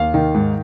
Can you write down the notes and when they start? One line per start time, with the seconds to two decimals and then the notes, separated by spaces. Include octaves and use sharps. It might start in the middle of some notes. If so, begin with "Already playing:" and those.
Already playing: D#2 F5
0.14 D#3
0.35 G#2